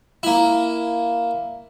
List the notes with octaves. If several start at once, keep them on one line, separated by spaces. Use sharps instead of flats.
A#3 E4